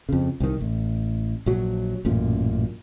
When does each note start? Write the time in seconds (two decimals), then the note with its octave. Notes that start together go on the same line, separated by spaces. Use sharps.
0.09 F2 C#3
0.40 C2 D#3
0.61 A1
1.46 A#1 F#3
2.05 A1 F#2 A#2